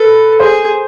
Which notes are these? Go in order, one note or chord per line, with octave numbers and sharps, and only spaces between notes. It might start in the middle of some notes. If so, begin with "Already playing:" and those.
Already playing: A4 B4
G#4 C5